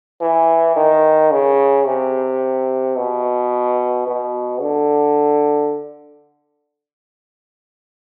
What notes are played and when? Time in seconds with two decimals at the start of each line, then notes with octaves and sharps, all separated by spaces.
0.21 E3
0.76 D#3
1.31 C#3
1.86 C3
2.96 B2
4.07 B2
4.61 D3